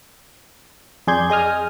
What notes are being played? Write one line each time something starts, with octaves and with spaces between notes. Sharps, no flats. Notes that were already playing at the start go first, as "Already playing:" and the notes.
F2 G#4 D5 C6 G6 G#6
G#4 D#5 D#6 F6